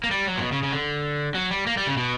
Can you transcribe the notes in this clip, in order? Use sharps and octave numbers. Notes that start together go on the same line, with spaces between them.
A#3
G3
F#3
A#2
B2
C#3
C#3
D3
F#3
G3
A#3
G3
C#3
B2